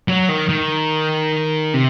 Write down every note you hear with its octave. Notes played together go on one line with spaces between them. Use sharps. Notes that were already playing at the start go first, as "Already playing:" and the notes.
F#3
D#3
D#3
C3